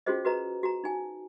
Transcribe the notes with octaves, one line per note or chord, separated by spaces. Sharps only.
C#4 F4 F#4 G#4 C5 D#5
F#4 B4 D#5 A#5
F#4 A#5
D#4 G#5